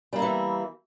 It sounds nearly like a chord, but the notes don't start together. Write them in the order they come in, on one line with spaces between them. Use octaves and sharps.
G3 A#3 E4 E3